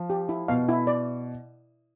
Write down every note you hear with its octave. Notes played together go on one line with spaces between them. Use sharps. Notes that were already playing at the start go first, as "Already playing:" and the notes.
Already playing: F3
G4
E4
B2 F5
E4
D5